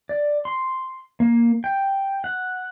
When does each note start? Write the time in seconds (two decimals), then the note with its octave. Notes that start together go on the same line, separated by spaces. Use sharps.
0.09 D5
0.45 C6
1.20 A#3
1.64 G5
2.24 F#5